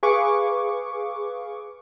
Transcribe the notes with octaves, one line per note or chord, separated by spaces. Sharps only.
G#4 B4 F5 C#6 D6